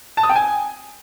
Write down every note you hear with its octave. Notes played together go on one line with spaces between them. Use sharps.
A5
D#6
G5
G#5